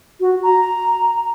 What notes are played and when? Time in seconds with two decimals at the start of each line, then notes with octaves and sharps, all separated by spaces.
0.21 F#4
0.43 A#5